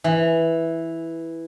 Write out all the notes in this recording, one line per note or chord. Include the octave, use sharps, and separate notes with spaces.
E3